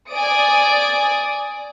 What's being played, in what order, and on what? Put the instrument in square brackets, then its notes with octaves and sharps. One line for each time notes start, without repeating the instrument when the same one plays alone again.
[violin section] D5 G#5 D#6 D7